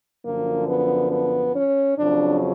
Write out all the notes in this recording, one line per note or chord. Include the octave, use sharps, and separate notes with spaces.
F#2 D3 F3 A#3
B3
B3
C#4
F2 C#3 F#3 D4